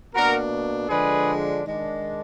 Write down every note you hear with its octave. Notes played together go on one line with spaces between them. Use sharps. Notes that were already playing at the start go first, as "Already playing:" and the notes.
B2 A#3 D4 F#4 A#4
D3 F3 G#3 D4 G#4 B4
D#3 G#3 D4